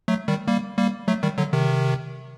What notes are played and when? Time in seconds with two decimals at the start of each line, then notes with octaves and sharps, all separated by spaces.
0.08 F#3 A3
0.28 D#3 G3
0.47 G3 A#3
0.78 G3 A#3
1.08 F#3 A3
1.23 D#3 G3
1.38 D3 F#3
1.53 C3 D#3